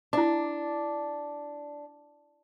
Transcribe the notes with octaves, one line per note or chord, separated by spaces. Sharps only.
D4 E4 D6